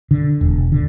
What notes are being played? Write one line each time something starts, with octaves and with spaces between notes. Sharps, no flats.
D3
E1
D3